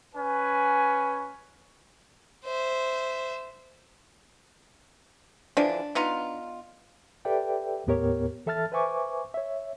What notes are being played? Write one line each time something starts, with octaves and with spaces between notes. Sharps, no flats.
C#4 B4 G#5
C5 E5
D3 E3 F3 D4
B3 D#4 F4
G4 A4 B4 D5 E5 G5
D#2 A2 B3 G4 A#4 C#5
E3 A4 E5 A5 F6 A6
B4 C5 E5 G#5 C#6 D6
C#5 E5